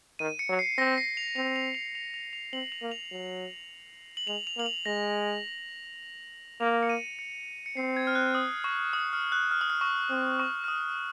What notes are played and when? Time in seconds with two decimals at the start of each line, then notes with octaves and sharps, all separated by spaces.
0.19 D#3 D#7
0.39 C#7
0.49 F#3
0.59 C7
0.78 C4 A#6
0.98 C7
1.17 F7
1.36 C4 F7
1.56 F7
1.75 F7
1.95 F7
2.14 F7
2.33 F7
2.53 C4 F#7
2.72 F7
2.82 A#3
2.91 F7
3.11 F#3
4.17 F#7
4.27 G#3 F7
4.47 F7
4.57 A#3 F#7
4.66 F7
4.86 G#3 A#6
6.60 A#3 F7
6.83 C#7
6.89 D#7
7.19 C#7
7.66 C#7
7.76 C4 C7
7.97 G#6
8.07 F6
8.15 F#6
8.35 D#6
8.64 C#6
8.93 D#6
9.13 F6
9.32 F#6
9.51 F6
9.61 D#6
9.70 F6
9.81 C#6
10.10 C4
10.40 C#6
10.64 F6
10.68 D#6